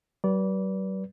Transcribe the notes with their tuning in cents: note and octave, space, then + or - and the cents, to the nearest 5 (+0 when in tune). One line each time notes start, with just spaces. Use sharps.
G3 -45 B4 -25 D5 -25